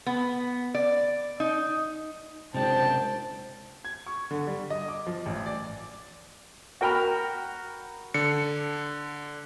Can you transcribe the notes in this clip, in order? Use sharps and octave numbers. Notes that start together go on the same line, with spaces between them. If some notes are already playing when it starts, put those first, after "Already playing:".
B3
D5
D#4
F#1 C3 G#3 D4 C5 G5 A5
G#6
C#6
D3
G3
D#5
D6
F3
A1
D5
F#4 A#4 G5 B5 F6
D3 C#7